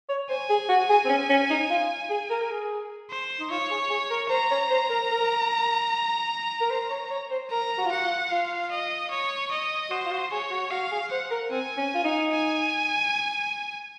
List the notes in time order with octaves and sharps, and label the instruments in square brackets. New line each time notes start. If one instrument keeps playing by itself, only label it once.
[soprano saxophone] C#5
[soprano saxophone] C5 [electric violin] G#5
[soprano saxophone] G#4
F#4
G#4
C4
C#4
C#4
D#4
F4
G#4
A#4
A#4
G#4
[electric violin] C5
[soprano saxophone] D#4
[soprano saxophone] F4 [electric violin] C#5
[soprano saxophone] G#4
G#4
A#4
[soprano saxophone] C5 [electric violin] A#5
[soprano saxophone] C#5
C5
A#4
A#4
A#4
C5
C#5
C#5
C5
[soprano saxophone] A#4 [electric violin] A#5
[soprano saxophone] F#4
F4
[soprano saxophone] F#4 [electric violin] F#5
[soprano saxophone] F4
[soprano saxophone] F4 [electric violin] F5
[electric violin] D#5
C#5
D#5
[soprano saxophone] F#4 [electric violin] C5
[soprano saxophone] F4
F#4
[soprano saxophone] G#4 [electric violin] C#5
[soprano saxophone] F#4
[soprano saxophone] F#4 [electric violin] F5
[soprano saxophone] G#4
[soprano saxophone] C5 [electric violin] F#5
[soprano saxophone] A#4
[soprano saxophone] C4 [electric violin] G#5
[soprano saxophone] C#4
F4
D#4
[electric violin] G#5